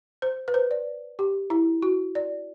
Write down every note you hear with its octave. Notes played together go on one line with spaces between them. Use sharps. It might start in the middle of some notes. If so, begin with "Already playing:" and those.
C5
B4
C5
D5
G4
E4
F#4
D5